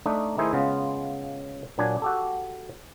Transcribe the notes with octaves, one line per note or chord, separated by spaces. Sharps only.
A3 D4 D#4
D#3 A3 D#4 E4 G#4 C5
C#3 G#3 B3 F4
A#2 F#3 D4 G#5
F#4 G4 A4